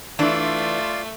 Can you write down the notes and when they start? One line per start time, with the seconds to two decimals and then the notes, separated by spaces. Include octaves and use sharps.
0.19 E3 A3 D4 F4 D5 C6